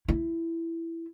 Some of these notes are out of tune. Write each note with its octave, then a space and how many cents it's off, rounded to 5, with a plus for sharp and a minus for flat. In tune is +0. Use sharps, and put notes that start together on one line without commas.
E4 +10